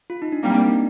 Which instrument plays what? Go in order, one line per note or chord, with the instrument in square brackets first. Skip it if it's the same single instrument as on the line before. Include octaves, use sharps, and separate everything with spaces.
[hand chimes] F4
D#4
D4
[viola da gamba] G3 A#3 [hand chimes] C4
[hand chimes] D4
D#4